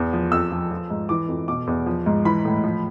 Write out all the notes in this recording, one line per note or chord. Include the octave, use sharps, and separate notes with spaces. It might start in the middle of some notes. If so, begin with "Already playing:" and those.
Already playing: E2
F3
F2 E6
F3
F3
G#2
E3 D6
F2
B2 D6
E2
F3
G#2
E3 B5
A2
F3